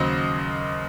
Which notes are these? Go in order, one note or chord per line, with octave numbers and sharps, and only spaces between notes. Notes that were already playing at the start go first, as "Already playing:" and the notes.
Already playing: D#2 C#3 F#3 C5 D#5